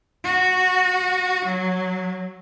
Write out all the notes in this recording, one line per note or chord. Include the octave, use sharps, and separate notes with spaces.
F#4
F#3